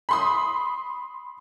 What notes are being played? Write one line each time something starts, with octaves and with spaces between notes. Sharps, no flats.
B5 C6 D#6